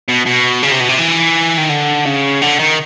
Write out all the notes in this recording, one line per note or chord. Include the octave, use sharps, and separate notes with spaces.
B2
B2
C#3
C3
B2
C3
E3
D#3
D3
C#3
D3
D#3